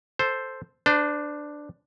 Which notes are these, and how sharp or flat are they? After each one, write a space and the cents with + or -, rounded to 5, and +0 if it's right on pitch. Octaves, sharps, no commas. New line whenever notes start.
A4 +0 C5 +0
D4 +5 C5 -40